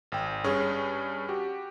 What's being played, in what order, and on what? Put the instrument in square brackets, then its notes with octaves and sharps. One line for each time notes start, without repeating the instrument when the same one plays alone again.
[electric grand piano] G#1 G5
G2 C#4 G#4
F#4 G4